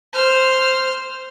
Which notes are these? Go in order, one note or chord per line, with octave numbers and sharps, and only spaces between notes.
C5 F6